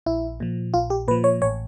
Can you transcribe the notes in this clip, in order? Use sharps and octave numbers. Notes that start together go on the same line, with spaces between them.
A#1 E4
A#2 F3
A#1 F4
G4
A#2 F3 B4
C#5
A1 C#5